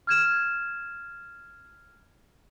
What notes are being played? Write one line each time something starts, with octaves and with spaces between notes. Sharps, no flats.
F6 G#6 E7